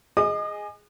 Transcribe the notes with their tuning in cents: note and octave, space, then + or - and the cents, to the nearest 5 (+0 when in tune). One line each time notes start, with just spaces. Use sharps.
G#4 +0 D#5 +0 D#6 -45